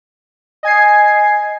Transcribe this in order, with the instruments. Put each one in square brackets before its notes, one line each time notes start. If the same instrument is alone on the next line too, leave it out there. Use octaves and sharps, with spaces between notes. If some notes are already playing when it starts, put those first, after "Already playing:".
[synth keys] D#5 G#5 G#6 C7